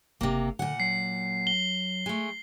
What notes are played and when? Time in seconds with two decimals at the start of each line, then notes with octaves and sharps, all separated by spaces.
0.21 F#1 C3 A#3
0.59 A#2 D3 F#5
0.80 F#3 C7
1.47 G7
2.06 G#3 A3